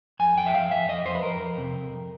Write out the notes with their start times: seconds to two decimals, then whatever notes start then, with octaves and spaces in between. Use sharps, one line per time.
0.20 F2 G#5
0.37 F2 G5
0.46 E5
0.54 F2 F5
0.71 F2 E5
0.89 F2 D#5
1.06 F2 C5
1.15 B4
1.23 F2 A#4
1.40 F2
1.58 C3
1.74 F2
1.92 F2